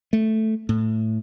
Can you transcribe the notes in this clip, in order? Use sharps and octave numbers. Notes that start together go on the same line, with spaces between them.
A3
A2